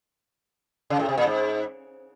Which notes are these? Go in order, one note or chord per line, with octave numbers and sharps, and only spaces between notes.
C#3
A2
C3
A#2
G#2